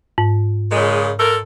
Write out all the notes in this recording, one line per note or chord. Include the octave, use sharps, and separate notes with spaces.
G#2
A#2 C#3 G#3
A#2 A4 A#4